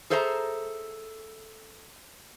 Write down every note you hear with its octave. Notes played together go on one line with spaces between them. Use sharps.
G#4 A4 C5 E5 F#5 A#5